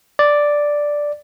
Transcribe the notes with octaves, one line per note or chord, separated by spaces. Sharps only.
D5